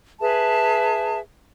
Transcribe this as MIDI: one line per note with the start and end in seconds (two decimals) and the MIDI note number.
0.20 1.19 68
0.20 1.19 71
0.20 1.19 76
0.20 1.19 81